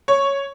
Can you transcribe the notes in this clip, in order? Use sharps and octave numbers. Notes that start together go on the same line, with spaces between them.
C#5